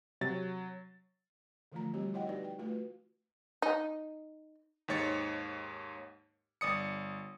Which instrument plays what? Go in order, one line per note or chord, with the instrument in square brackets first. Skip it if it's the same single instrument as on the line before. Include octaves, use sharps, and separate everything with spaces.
[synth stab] C3 [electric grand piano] F#3 A6
[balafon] D3 E3 F3 A3 F4 A#5
G3 C4 F#4 G4 C#5
E4 F#4 C#5 D#5 F#5 G5
D#4 G4 B4 D5
G5
A3 F4 F#4 B4
[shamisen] D#4
[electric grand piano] D#2 G#2 C#5 A6 C#7
G1 D5 D#6 C#7